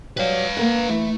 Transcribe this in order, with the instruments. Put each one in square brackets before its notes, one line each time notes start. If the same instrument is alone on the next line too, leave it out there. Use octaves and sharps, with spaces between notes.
[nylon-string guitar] F#3 G3 [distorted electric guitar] B4 F5
[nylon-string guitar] A#3 A#4 F#5
[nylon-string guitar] E3 [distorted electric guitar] A3